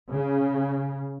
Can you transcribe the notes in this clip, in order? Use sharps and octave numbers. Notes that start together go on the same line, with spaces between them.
C#3